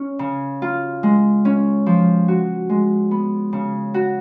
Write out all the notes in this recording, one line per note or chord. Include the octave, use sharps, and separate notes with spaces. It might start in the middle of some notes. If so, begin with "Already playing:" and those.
Already playing: C#4
C#3
F4
G#3
C#4
F3
F#4
G#3
B3
C#3
F#4